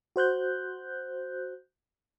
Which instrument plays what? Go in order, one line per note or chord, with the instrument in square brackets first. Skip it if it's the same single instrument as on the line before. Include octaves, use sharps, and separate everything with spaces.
[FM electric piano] F#4 C5 F#6 G6